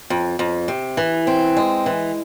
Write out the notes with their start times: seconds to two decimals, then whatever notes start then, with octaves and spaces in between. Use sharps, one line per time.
0.10 F2
0.39 F2
0.68 C3
0.97 E3
1.27 C4
1.57 G#3
1.86 E3